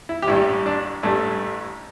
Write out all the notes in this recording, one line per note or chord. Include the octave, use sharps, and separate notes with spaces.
E4
G4
A1 G2 G3 E4
D4
A1 G2 G3 A3